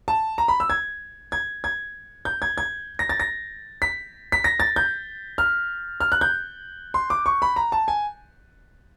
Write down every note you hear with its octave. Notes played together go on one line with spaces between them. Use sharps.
A5
A#5
B5
E6
G#6
G#6
G#6
G6
G#6
G#6
A#6
A6
A#6
B6
B6
A#6
A6
G6
F6
F6
F#6
G6
C6
D6
C#6
B5
A#5
A5
G#5